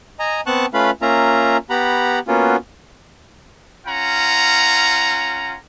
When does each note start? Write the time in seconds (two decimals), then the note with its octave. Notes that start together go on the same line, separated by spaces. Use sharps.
0.19 D#5 G#5 A#5
0.46 B3 C4 F#5 A5 C#6 F#6
0.74 A3 C#4 F4 B4 F5 B5
1.02 A#3 C#4 F4 E5 A#5
1.70 B3 G4 F#5 A#5 B5
2.28 A#3 B3 C#4 F4 F#4
3.87 C#4 F4 F#5 A#5